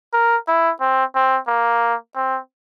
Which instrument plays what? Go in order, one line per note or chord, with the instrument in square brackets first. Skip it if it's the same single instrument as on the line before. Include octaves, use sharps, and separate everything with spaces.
[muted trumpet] A#4
E4
C4
C4
A#3
C4